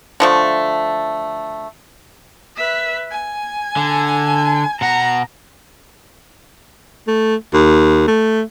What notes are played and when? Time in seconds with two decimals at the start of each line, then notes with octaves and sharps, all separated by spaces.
0.20 D3 F3 A3
2.56 B4 E5
3.11 G#5
3.77 D3
4.81 B2 F#5 A#5
7.07 A3
7.54 D#2
8.08 A3